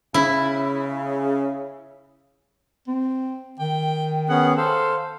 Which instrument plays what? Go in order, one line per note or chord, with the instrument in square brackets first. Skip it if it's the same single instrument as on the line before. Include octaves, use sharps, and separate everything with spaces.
[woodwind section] C#3 [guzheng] E4
[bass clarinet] C4
[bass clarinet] D#3 [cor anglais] G5
[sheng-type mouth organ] B3 C#4 G#4 [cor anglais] F#5
[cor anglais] A4 [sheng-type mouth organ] C5 F5